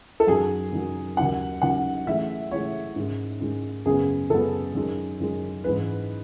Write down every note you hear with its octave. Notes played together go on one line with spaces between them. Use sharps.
A4
F#2 D#3 F#3 G#4
F#2 D#3 F#3
D#2 D#3 F#3 C#4 F#5
D#2 D#3 F#3 C#4 F#5
A1 A2 G#3 E5
A1 A2 G#3 C#5
G#2 D#3 G#3 C#4
G#2 D#3 G#3 C#4
F#2 C#3 G#3 B3 G#4
F#2 C#3 G#3 B3 A4
F#2 D#3 G#3
F#2 D#3 G#3
G#2 E3 G#3 C#4 B4